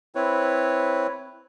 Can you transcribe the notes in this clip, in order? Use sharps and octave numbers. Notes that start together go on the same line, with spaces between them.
C4 E4 B4 C#5